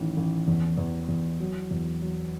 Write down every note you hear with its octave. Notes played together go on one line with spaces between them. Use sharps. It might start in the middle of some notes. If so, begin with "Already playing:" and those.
Already playing: A1 D#3 F#3
A1
E2
E2
E2
F#3
E2
F#3